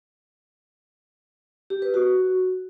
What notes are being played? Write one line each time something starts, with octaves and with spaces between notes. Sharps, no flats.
G4
B4
F#4